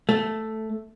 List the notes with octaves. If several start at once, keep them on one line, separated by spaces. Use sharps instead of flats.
A3